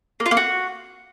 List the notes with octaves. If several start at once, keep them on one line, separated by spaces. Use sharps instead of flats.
A#3
F4
A#3
F#4